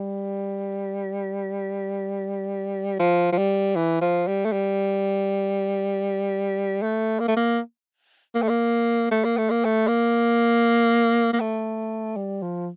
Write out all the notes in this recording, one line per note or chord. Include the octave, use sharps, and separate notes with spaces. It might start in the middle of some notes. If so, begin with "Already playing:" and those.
Already playing: G3
F3
F3
G3
E3
F3
G3
A3
G3
A3
A#3
A3
A#3
A#3
A3
A#3
A3
A#3
A3
A#3
A3
A#3
A#3
A3
G3
F3